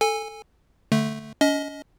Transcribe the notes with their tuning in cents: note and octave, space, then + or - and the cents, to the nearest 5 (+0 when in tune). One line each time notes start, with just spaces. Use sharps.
A4 +0 G#5 -15
D3 -5 A3 +0
C#4 +40 D#5 +10